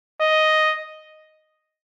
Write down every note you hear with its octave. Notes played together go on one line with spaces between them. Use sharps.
D#5